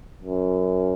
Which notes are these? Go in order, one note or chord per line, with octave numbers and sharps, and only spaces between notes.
F#2